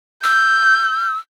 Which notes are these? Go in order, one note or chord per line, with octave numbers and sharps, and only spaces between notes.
E6 G6